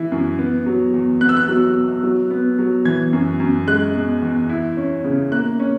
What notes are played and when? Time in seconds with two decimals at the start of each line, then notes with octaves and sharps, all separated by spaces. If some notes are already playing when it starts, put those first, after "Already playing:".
Already playing: E3 E4
0.12 F#2
0.39 B3
0.66 F#3
0.94 E2
1.21 B3 F#6
1.29 E6
1.37 F#6
1.48 F#3
1.76 B2
2.03 F#3
2.31 B3
2.59 F#3
2.85 E3 G#6
3.13 F#2
3.40 F#2
3.67 G#3 F#6
3.95 B2
4.22 E2
4.49 E4
4.77 C#4
5.04 C#3
5.32 A#3 F#6
5.60 C#4